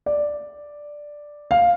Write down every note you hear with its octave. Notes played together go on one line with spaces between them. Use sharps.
D5
F5